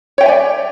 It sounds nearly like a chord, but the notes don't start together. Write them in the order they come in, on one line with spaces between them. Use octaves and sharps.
C#5 G5 E5 G#5 D5